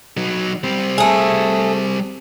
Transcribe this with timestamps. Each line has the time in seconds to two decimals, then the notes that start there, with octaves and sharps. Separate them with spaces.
0.17 F#3 D#4
0.64 G3 C4
0.98 A3 G#4